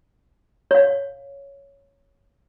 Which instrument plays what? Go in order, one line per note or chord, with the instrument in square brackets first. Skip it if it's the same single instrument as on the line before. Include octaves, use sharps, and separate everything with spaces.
[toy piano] C#5 F5